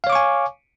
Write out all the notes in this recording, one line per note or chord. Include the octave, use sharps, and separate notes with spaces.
C#5 F5 G#5 C#6 D6